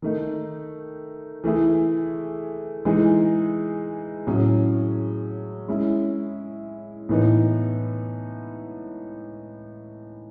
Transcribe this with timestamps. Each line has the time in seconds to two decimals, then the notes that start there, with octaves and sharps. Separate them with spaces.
0.02 D#3 A3 D#4
1.44 E3 A3 E4 G#4
2.85 E3 G#3 D#4 G#4
4.27 A2 F#3 C#4 G#4
5.68 G#3 C#4 E4
7.09 A2 E3 B3 D#4